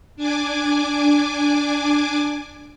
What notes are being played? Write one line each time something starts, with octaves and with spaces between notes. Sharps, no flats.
D4 G#5 D6